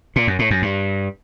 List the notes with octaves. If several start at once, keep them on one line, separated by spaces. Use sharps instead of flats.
A#2
F#2
A2
F#2
G2